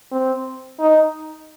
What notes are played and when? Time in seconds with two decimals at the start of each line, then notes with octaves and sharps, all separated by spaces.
0.12 C4
0.80 D#4